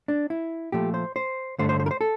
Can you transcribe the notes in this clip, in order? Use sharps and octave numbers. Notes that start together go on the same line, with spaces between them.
D4
E4
A#2 F3 A3 G4
C5
C5
G2 D3 A3 C5
C5
C5
A#4
C5
A4